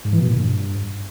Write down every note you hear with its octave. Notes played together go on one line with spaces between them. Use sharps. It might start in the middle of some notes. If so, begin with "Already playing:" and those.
G#2
E3
B2
A#2
G2